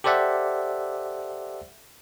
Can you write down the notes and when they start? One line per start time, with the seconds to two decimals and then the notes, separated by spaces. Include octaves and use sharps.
0.04 G4 A4 C5 D5 E5 F#5